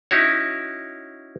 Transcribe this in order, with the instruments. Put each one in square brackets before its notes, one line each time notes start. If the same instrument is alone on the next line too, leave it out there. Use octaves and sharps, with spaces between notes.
[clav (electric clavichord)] C#4 D#4 E4 F#4 C#5